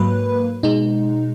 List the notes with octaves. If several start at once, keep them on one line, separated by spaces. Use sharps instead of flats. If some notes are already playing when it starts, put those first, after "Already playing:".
Already playing: G#2 F#3 A#3 B4
B2 G#3 D#4